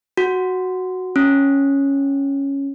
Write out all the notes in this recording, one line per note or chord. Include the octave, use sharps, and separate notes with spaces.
F#4
C#4